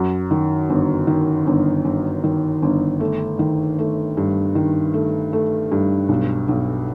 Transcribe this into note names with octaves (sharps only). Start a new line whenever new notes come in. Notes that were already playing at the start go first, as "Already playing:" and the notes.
Already playing: F#2
D#3
G1
D#3
G1
G1
D#3
G1
A3
D#3
A3
G2
D#3
A3
A3
G2
B1
B1